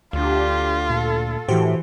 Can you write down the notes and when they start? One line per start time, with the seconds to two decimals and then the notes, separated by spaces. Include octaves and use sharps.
0.13 D2 D4 F4 G4
0.90 A#2 A4
1.48 A2 E3 F#4 G4 C5